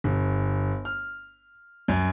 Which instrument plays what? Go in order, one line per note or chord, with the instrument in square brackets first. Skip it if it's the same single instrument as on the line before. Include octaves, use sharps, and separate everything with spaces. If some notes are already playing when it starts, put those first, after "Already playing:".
[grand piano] G1
F6
F#2